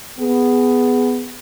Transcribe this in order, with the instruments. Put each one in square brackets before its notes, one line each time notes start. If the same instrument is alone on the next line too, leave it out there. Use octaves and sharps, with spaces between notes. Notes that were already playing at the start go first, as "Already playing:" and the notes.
[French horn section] B3 G#4